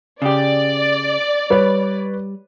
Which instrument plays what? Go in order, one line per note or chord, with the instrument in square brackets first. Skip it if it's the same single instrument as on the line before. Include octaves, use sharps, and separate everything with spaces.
[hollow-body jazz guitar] C#3 G4 [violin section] D5
[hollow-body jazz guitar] G3 [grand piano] B4 C#5